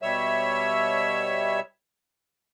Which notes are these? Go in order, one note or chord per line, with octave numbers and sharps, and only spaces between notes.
B2 G3 C#5 E5 E6